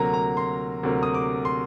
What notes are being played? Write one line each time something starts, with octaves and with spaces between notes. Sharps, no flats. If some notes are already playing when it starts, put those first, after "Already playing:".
Already playing: D2 C3 F#3 A#3 A#5
A#5
C6
D2 C3 F#3 A#3
D#6
D6
C6